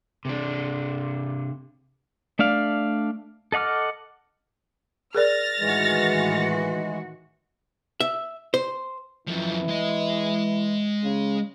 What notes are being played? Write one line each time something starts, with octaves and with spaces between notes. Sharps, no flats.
C3 D4
A3 D4 D5 F5
A4 D#5 F#5 D6 F6
G#4 A#4 D5 F6 A6 A#6
A2 D#3 E3 G#3 F#4
E5
C5
F#2 E3 F3
G#3 D#5
C#3